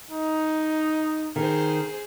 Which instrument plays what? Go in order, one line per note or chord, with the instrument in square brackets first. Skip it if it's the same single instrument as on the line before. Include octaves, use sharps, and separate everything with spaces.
[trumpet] D#4
[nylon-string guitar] D#3 [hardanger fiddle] G#4 C5